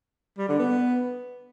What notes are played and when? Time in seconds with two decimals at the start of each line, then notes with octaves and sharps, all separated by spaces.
0.38 G3
0.48 D3
0.59 B3